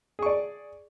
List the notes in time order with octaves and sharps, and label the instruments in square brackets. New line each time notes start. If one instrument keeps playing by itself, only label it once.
[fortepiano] G#4
C#6
D5